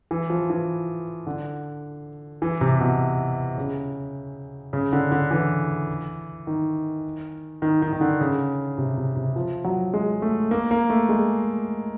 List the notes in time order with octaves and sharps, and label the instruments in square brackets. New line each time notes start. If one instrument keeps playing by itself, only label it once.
[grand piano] E3
F3
E3
D3
E3
C3
B2
C#3
C#3
D3
D3
E3
D#3
D#3
D#3
D#3
D3
C#3
C3
C3
C3
F3
F#3
G#3
A3
A#3
A#3
A3
G#3